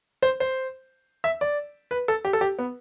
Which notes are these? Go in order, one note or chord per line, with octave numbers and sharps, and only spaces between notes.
C5
C5
E5
D5
B4
A4
G4
A4
G4
B3